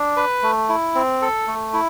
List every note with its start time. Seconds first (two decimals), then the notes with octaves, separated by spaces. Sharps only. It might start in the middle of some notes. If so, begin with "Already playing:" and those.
Already playing: D4
0.17 B4
0.43 A3
0.69 E4
0.95 C4
1.22 A4
1.47 A3
1.73 E4